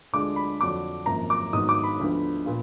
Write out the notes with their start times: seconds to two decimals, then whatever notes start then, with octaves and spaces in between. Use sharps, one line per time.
0.13 D2 D3 G#3 D4 F4 D6
0.36 B5
0.60 F2 D3 F#3 D4 D6
1.06 G#1 F#2 F3 A#3 A#5
1.30 D6
1.53 G#2 D#3 F#3 B3 D#6
1.69 D6
1.83 B5
2.00 D2 D3 F3 B3
2.46 A#2 B3 F4